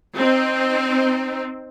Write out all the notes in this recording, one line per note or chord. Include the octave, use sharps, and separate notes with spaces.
C4 D#4